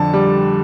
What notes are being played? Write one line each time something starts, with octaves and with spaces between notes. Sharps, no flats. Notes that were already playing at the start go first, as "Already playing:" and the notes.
Already playing: F2 D3 A5
G3